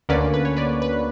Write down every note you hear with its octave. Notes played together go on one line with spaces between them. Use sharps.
D2 D3 A#3 C#4 B4 D5
B4
C#5
B4 D5
B4